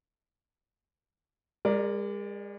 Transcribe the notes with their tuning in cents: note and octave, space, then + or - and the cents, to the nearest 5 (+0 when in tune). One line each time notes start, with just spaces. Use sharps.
G#3 -40 A#4 +0 D5 +0